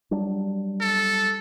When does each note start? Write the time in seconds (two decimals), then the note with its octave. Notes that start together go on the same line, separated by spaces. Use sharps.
0.11 F#3 G3 D4
0.81 A4